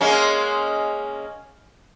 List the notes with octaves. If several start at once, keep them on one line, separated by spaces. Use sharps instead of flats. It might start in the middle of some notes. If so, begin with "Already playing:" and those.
G#3 A#3 C#4